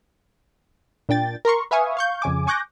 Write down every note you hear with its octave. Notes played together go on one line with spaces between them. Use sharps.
A#2 D4 G5 A6
A#4 A#5 C6 C#6
B4 E5 F5 G#5 C#6 D#6
F5 C#6 G6
F2 C#3 G#5 D6
G#5 C#6 D6 F#6 G6 A#6